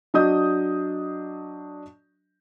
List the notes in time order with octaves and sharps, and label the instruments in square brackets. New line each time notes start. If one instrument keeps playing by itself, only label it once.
[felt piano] F#3 D4 D#5 D#6 G6